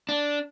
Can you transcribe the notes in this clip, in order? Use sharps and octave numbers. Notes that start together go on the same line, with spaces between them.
D4